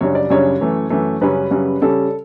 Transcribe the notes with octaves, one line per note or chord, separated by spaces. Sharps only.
F#2 C#3 G3 D4 C#5
D5
F#2 C#3 G3 D4 C#5
F#2 E3 A3
F#2 E3 A3
F#2 C#3 G3 C#4 B4
F#2 C#3 G3 C#4
C#3 G3 C#4 A4